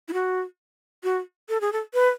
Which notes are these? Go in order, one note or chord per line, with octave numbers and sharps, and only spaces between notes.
E4
F#4
F#4
A4
G#4
A4
B4